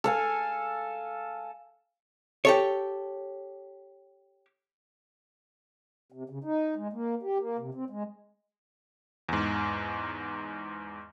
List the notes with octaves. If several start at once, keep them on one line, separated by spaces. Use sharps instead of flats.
A4 F5 G#5
G4 A4 C#5
C3
C#3
D#4
G#3
A#3
G4
A#3
C3
C4
G#3
E2 G#2